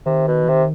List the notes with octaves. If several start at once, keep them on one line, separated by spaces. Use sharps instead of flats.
C3 D#3
B2
E3
C3 D#3